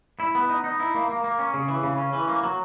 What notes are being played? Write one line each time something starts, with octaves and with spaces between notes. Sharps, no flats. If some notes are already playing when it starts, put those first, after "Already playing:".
E4
B3
D#4
D#4
E4
A#3
A#3
A#3
C#4
C#3
E3
C#3
C#4
E3
A#3
F#3